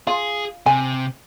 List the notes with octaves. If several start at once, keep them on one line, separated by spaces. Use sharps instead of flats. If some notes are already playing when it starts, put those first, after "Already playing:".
F4 G#4
C3 G#5